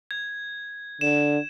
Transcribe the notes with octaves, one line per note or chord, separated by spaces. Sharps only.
G#6
D3 E7